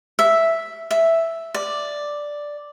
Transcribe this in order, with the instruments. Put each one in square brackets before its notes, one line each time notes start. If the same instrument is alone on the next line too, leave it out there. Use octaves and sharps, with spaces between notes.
[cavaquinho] E5
E5
D5